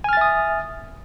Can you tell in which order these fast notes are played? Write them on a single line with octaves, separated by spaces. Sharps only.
G#5 F6 A6 E5 D#6